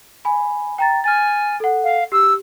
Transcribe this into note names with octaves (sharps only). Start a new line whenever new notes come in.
G#5 B5
G5 A#5 A6
G#5 F6 A6
A4 F#5
F5
G4 E6